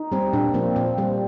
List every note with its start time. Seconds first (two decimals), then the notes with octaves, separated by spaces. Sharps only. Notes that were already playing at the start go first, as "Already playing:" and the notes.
Already playing: D#4
0.12 G3 C4
0.33 A#2 D4
0.54 F3 A#3 C4
0.76 A#2 C4
0.98 G3 C4